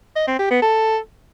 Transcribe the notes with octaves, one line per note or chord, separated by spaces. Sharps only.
D#5
C4
G4
B3
A4